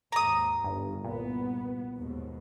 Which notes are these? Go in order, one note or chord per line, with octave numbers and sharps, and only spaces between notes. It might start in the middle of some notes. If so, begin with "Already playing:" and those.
D#2 G#2 A#5 D#6
G1 G2
C2 A#2 B3
D#2 G#2 B2